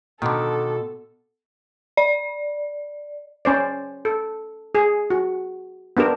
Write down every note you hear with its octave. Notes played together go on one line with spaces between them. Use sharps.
B2 D3 D#3 A4
D5
C#4 C5 D5
A4
G#4
F#4
B3 D4 G4 A#4